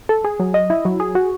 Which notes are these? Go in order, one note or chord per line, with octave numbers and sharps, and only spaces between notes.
A4
G#4
F#3
D#5
E4
F#3
G#4
F#4